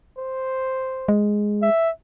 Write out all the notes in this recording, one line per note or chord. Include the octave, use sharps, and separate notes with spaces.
C5
G#3
E5